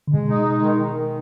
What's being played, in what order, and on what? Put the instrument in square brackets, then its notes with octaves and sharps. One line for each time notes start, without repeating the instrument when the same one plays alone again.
[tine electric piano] D3
[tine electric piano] B2 [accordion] G#3
[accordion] D#4
G#3
D#3
D#3
D#3